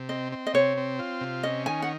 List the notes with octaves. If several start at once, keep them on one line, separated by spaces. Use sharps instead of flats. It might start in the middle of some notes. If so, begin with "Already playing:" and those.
Already playing: C3
C4 D#5
C4
D#5
C3 C#5
C4
F4
C3
C#4 D#5
D#3 G#5
F#5